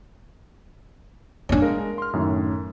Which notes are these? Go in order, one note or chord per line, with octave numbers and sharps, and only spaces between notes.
D4 E4 C#5 D5 G#5
G#3 A#4 F5
C6 F6
F#2 A2 D#3